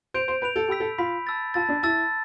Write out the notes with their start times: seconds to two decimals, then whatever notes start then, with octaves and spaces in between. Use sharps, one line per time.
0.14 C5 G6 D7 F7
0.28 C5
0.42 B4 G6 D7 F7
0.56 A4
0.68 G4 B5 E6 B6
0.80 A4
0.98 F4 B5 E6 B6
1.27 A5 E6 A6
1.54 F4 A5 E6 A6
1.69 D4
1.83 E4 A5 E6 A6